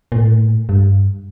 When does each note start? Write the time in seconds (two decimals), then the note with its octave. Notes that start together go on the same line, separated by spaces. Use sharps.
0.12 A#2
0.16 A2
0.69 G2